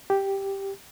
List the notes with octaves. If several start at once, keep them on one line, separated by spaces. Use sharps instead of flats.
G4